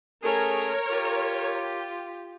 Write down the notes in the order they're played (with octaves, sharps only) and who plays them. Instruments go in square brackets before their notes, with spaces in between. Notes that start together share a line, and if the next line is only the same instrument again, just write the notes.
[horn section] A3 C#4 G#4 [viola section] A#4 C#5
[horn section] F4 G4